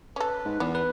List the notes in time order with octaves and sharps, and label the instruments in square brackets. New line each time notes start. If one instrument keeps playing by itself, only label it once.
[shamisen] C#4 A4 [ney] B4
[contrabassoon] G#2
[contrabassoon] E2 [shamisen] B3
[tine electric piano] B4